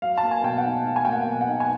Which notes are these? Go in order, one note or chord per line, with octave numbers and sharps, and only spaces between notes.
F#3 F5
A5
A#3
G#5
B2 G5
F#5
D#4
F#3 F5
G#5
A#3 G5
F#5
B2
F#5
D#4
G#5